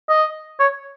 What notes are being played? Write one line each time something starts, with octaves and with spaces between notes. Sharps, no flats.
D#5
C#5